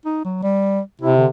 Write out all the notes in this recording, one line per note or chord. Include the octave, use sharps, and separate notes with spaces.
D#4
F#3
G3
C3 E4
D3